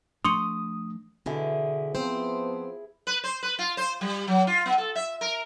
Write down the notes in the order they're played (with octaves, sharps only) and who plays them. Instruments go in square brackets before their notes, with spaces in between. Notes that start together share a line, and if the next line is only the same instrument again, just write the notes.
[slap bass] F3 A3 D4 [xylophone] C6 C#6 C#7 [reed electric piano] D#6
[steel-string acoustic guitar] B2 D3 E3 [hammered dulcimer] E4 G#4
[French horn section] F3 B3 [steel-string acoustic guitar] C4 C5
[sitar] B4
C5
B4
F4
C5
G3
F#3
F4
B3
A4
E5
A#4